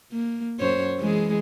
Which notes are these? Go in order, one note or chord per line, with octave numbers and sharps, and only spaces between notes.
A#3
F#2 C5 C#5
E3 G#3 G#4